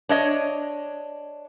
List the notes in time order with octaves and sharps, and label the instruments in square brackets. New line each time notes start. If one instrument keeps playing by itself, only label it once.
[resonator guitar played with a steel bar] D4 C#5 D#5